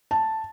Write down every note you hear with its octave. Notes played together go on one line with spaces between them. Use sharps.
A5